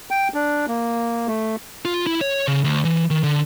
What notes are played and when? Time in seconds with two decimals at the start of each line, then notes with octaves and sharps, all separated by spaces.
0.11 G5
0.34 D4
0.68 A#3
1.28 A3
1.85 F4
2.07 E4
2.21 C#5
2.48 C#3
2.64 D2
2.85 E3
3.10 D#3
3.24 D3